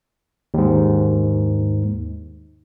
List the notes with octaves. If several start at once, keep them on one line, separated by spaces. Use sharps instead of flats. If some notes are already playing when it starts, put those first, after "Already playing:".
D#2 G#2